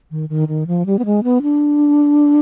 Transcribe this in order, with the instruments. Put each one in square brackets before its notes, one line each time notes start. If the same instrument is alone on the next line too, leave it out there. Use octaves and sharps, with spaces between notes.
[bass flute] D#3
D#3
D#3
F3
G3
B3
G#3
B3
D4